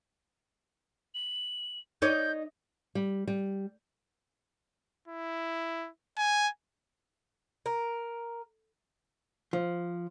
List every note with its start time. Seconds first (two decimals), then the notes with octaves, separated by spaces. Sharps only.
1.14 F#7
2.02 D#4 C#5 D5 G6
2.95 G3
3.27 G3
5.08 E4
6.18 G#5
7.66 A#4
9.53 F3